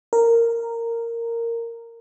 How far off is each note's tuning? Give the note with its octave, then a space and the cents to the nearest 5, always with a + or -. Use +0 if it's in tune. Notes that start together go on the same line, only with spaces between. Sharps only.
A#4 -10